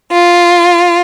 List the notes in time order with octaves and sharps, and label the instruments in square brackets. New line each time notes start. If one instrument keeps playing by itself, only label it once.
[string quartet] F4